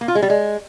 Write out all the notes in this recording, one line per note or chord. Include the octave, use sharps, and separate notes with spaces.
A#3
F4
G#3
G3
G#3